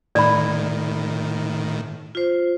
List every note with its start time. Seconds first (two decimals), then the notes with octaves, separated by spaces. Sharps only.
0.15 A2 D#3 D5 B5
2.15 F4 C5